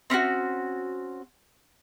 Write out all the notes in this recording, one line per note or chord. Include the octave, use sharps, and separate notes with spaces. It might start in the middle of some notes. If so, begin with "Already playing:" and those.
C4 C#4 D#4 F#4